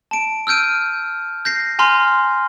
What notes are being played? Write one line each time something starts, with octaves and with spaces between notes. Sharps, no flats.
A5 D7
E6 F6 G6 D7 D#7
G6 A#6 C7
G#5 A#5 C6 F6